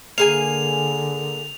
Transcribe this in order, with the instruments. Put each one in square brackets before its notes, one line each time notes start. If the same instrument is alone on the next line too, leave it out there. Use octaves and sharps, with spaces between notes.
[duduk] D3 [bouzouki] A#3 G#4 G#5 [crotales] F7